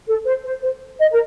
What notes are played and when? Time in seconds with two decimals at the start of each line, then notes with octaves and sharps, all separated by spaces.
0.08 A4
0.25 C5
0.44 C5
0.62 C5
0.99 D#5
1.11 A#4